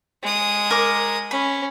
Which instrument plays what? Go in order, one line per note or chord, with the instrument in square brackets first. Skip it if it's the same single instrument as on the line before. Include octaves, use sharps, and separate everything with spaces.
[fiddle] G#3 D#6
[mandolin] A#4 A#5 D6
[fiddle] C#4 [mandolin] B5